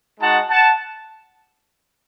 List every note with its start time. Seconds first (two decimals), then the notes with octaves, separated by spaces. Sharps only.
0.20 G#3 D#4 F#4 F#5 A5
0.49 F#5 A5